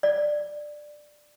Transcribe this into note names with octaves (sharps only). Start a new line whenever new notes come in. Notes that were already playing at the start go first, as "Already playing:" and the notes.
D5